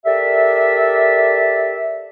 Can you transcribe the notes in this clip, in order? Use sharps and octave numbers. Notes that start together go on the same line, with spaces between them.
G4 A4 A#4 D5 E5